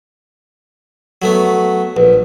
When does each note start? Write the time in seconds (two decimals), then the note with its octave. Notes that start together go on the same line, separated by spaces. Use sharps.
1.22 F#3 A3 B3
1.97 A#1 B4